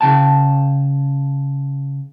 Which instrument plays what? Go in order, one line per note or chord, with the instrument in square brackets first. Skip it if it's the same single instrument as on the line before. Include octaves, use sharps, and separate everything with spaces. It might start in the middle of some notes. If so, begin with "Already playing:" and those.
[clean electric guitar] C#3 G5 A5